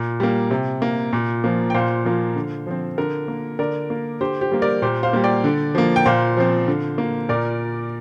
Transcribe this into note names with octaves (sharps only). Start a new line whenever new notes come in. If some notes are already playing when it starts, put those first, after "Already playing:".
Already playing: A#2
G3 A#3
C3
A#3
A#2
F3 A#3
G5
A#2 C5 F5
F3 A#3
D3
F3 C4
D3 A#4
A#3
D3 A#4 D5
A#3
D3 G4 C5
G4 C5
G3 A#3
A#4 D5
A#2 G4 C5
C5 F5
G3 A#3
D5 G5
D3
F3 A#3
G5
A#2 C5 F5
F3 C4
D3
A#3
A#2 A#4 D5